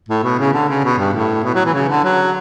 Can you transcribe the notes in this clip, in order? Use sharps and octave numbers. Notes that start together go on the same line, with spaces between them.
A2
B2
C#3
D3
C#3
B2
G2
A2
B2
F#3
E3
C#3
D3
F#3